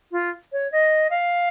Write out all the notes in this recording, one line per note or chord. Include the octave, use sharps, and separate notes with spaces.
F4
C#5
D#5
F5